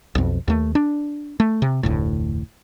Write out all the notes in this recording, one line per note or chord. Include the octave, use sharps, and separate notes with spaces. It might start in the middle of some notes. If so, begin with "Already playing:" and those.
B1 F2
D#2 A3
D4
A3
C3
F1 D2 A2